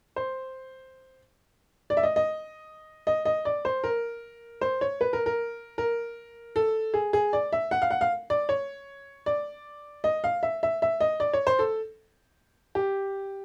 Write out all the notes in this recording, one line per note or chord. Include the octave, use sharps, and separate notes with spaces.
C5
D5
E5
D#5
D#5
D#5
D#5
D5
C5
A#4
C5
C#5
B4
A#4
A#4
A#4
A4
G#4
G#4
D5
E5
F#5
F5
F#5
F5
D5
C#5
D5
D#5
F5
E5
E5
E5
D#5
D5
C#5
C5
A4
G4